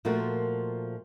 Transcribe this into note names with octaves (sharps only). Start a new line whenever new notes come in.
A#2 F3 A3 A#3 F4 F#4